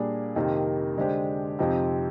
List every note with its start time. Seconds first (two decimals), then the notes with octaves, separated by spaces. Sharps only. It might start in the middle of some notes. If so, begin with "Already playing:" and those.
Already playing: A#2 G3 D4 G#4
0.35 F2 C3 D#3 A#3 D#4
0.97 D3 G#3 D4 G4 C5
1.59 F2 C3 F3 C4 D#4